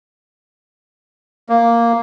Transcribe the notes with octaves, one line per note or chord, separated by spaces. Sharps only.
A#3